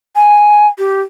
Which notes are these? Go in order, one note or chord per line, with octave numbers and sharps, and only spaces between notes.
G#5
G4